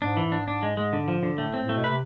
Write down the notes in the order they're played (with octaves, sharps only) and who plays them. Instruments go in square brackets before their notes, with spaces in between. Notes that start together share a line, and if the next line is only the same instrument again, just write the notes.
[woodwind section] G#2 [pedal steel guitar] D4
[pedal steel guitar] E3
[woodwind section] G#2
[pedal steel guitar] D4
D4
G#3
G#3
D3
F3
D3
[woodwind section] A2 [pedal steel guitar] A3
[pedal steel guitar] C4
[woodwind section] A2
[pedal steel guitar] A3
[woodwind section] B2
[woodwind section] C3 [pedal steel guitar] B4